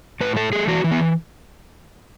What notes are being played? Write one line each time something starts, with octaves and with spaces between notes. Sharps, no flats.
A2 B4
A3 A4
A3 G#4
E3 F#4
E3
B3